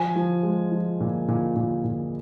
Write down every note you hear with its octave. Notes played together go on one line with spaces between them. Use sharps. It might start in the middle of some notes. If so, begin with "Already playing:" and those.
Already playing: F3 G#5
F3
G#3
F3
A#2
A#2
A#2
A#2